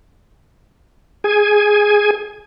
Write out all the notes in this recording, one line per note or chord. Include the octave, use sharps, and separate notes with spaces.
G#4 G#5